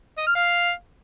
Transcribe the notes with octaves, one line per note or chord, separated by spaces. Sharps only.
D#5
F6
F5